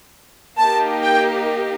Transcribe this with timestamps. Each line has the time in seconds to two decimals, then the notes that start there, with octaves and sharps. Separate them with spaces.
0.58 A#3 D#4 G4 A5
1.03 G5